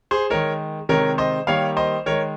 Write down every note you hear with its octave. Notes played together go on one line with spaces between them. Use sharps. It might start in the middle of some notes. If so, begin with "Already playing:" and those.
G#4 C5
D#3 G#3 A#4 C#5
C3 D#3 G#3 A#4 C#5
C5 D#5
D#3 G3 A#3 C#5 F5
C5 D#5
D#3 G#3 A#4 C#5